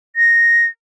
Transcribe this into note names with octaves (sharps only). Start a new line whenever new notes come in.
A#6